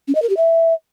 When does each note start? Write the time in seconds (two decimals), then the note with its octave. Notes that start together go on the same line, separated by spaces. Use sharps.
0.08 C#4
0.15 D#5
0.22 A#4
0.29 G4
0.37 E5